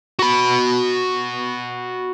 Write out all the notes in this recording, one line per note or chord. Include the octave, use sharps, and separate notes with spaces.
F#4 B5